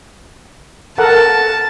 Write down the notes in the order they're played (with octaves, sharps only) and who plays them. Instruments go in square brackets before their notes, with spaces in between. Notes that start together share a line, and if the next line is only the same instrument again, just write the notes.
[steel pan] A4 A#4 F#5 [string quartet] A5